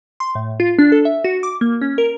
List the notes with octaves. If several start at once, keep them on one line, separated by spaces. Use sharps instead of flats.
C6
A2
F4
D4
A4
E5
F#4
D6
A#3
C#4
A#4